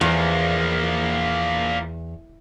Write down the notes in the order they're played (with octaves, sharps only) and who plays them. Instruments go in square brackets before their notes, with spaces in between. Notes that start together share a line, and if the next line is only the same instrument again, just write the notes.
[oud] E2 [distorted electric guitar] F3 A#3